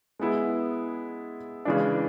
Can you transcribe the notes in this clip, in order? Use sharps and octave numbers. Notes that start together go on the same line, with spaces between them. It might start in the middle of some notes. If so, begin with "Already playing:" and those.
G#3 B3 E4 G#4
C#3 E3 G#3 D4